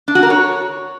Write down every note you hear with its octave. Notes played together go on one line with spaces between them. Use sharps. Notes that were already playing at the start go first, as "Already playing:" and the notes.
D4
F#4
A#4
C#5